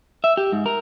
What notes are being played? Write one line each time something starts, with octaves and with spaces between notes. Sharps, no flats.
E5
G4
G#2
A#4